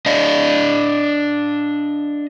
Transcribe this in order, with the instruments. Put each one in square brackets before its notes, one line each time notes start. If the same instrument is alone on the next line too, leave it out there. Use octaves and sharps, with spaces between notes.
[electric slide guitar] D4 D#5 F5